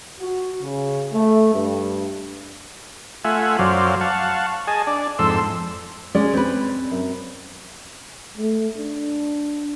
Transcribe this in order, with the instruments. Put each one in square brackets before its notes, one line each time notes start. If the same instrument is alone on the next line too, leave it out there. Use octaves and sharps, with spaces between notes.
[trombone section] F#4
C#3
A3
G2
[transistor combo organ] A3 F4 E5 F#5 G#5
F#2 F#3 C5 D5 F5
F5 F#5 A5 C#6
G#4 D#5 G#5 A5
D4 D5
F2 G#2 A4 C6 E6
[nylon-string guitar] G#3 [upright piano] C#4 D5
[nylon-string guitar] C4 B4
[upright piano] F#2
[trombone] A3
D4